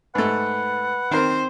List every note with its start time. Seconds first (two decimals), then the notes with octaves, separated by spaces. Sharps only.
0.15 G#2 A3 B4 F#5
1.11 D#3 C4 A#4 C5